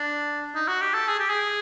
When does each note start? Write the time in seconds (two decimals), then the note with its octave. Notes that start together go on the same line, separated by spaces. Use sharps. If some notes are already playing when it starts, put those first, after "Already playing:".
Already playing: D4
0.55 D#4
0.68 F#4
0.81 G4
0.95 A4
1.08 G#4
1.19 G4
1.30 G#4